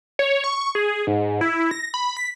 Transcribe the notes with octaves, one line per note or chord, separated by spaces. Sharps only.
C#5
C#6
G#4
G#2
E4
E4
A#6
B5
B6